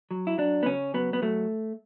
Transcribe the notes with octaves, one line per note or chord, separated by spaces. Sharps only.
F#3
E4
F#3 D4
B3
C#3 C#4
F#3 B3
B3
F#3 A3